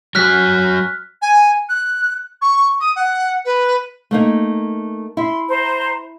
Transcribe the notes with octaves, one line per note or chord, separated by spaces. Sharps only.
F#3 F#4 G#5 F6 F#6 B6
G#5
F#6
C#6
D#6
F#5
B4
A3 A#3 D#4
E4 E5 C6
C5 A#5